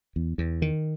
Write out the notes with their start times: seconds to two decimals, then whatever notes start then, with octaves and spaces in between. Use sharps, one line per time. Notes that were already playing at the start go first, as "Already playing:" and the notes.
0.16 E2
0.38 E2
0.62 D#3